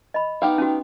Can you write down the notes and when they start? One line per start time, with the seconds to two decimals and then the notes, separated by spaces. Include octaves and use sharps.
0.14 D#5 B5
0.42 B3 D#4 G4 F5
0.58 C#4 F#4